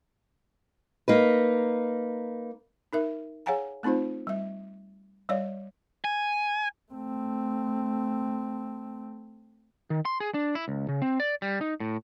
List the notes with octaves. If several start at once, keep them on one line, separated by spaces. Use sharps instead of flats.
A#3 D#4 B4
D#4 A#4 E5
G#4 C#5 F5 F#5 G#5 A#5
A3 C4 D#4 F4 C5
G3 E5
G3 C#5 D5 F5
G#5
A3 C4
D#3
C6
G#4
D4
E4
C#2
C#3
C4
D5
G3
D#4
A2